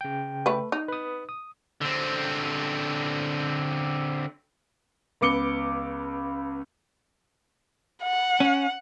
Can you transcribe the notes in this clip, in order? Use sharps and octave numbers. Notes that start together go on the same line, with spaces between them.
C#3 G5
A3 B4
D#4
B4 D#6
D#6
D3 C4
C#2 B3 D6 C#7 G7
F#5
C#4